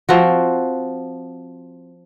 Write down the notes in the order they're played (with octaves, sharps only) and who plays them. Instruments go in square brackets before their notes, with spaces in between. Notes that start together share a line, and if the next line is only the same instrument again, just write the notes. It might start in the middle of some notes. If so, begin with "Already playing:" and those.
[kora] F3 C4 F#4